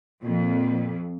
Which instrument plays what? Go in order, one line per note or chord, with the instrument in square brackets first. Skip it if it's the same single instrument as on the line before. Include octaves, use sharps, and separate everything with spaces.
[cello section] F2 [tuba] A#2